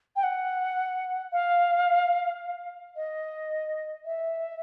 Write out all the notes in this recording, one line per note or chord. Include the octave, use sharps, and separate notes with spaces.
G5
F#5
F5
D#5
E5